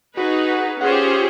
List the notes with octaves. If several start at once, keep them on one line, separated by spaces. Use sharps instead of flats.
D#4 F#4 G#4 B4
C#4 F4 F#4 G#4 C5
G4
G4
G4